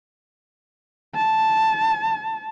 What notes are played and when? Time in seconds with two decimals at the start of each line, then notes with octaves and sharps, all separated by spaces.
1.15 A5